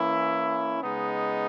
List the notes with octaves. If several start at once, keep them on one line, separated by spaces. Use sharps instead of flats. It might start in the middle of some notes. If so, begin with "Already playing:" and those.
Already playing: E3 A#3 C#4 E4
C#3 G#3 B3 D#4